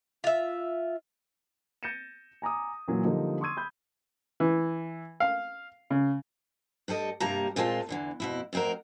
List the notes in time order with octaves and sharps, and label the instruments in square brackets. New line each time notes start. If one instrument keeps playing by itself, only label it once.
[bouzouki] F4 E5
[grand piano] G6 A6 A#6 C#7 D#7 E7
G#5 A#5 D6 D#6
A#2 E3 F#3 A#3
D3 F3 G3 A#3 D#4
C6 C#6 D#6 E6 G#6 D#7
B5 G6
[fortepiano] E3
F5
C#3
[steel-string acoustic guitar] G2 G3 A4 D#5
G2 C3 G3 A#3 A5 A#5
A#2 G#3 C4 E4 F4 A5
E2 D3 E3
F2 B2 E4
F2 A2 C4 F#4 A#4